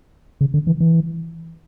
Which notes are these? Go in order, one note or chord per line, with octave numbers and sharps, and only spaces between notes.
C#3
D3
E3
E3